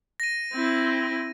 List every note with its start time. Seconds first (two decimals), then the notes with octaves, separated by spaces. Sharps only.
0.20 A#6 D#7
0.54 C4 E4